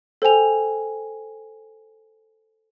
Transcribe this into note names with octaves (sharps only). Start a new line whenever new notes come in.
A4 C5 G5 G#5 F7